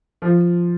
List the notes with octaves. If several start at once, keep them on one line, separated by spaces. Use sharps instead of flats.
F3